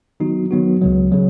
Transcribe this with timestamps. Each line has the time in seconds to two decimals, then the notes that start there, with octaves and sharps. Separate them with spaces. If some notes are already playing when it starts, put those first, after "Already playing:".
0.20 D#3 F#3 B3 D#4 F#4
0.51 D#3 F#3 B3 D#4 F#4
0.82 C#2 C#3 F#3
1.12 C#3 F#3